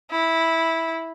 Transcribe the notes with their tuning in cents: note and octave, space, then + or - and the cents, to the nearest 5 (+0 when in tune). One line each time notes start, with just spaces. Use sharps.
E4 -10